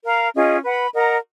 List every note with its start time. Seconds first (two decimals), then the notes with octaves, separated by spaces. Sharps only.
0.05 A#4 F5 A#5
0.35 C#4 F4 G#4 D#5
0.64 B4 F#5 B5
0.93 A#4 D#5 F#5 A#5